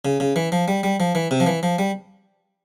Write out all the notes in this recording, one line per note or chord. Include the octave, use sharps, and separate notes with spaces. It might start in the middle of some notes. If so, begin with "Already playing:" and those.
C#3
C#3
E3
F3
G3
G3
F3
E3
C3
F3
E3
F3
G3